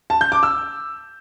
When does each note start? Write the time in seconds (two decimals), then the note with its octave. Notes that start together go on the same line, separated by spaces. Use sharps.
0.10 A5
0.21 G6
0.32 D6
0.43 E6